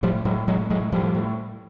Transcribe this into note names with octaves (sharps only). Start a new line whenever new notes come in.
A2 F3 G3
A2 F#3 G#3
A2 F#3 G#3
A2 F#3 G#3
A2 F3 G3
A2